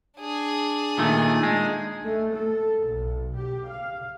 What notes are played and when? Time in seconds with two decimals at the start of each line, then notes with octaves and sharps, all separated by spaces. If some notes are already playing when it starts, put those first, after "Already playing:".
0.19 D4 G#4
0.98 A#2 D#3 A3
1.43 G#3
2.03 A3
2.35 A4
2.85 B1
3.36 G4
3.66 F5